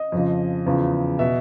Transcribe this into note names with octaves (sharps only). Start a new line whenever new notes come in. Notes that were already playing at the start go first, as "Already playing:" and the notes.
Already playing: D#5
F2 C#3 F3
E2 C#3 F3
B2 E5